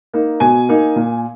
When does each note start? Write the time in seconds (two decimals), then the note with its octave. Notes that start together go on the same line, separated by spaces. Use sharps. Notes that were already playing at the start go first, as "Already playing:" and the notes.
0.14 A#3 D#4
0.40 B2 G#5
0.69 A#3 D#4
0.96 A#2